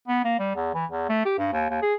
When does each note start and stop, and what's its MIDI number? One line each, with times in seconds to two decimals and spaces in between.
0.07 0.21 59
0.25 0.39 58
0.39 0.55 55
0.55 0.70 40
0.74 0.85 52
0.91 1.05 40
1.09 1.25 57
1.25 1.35 67
1.38 1.48 43
1.52 1.66 39
1.70 1.82 39
1.82 1.94 68